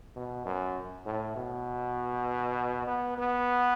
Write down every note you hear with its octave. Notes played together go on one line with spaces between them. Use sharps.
B2
F#2
A2
B2
B3
B3